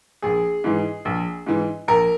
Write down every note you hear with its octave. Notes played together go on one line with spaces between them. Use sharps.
A#1 G#4
G#2 E3
A#1
G#2 E3
A#1 A#4